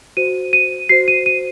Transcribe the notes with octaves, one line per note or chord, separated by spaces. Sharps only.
F#4 C5 D#7
D#7
F#4 C5 C7
D#7
D#7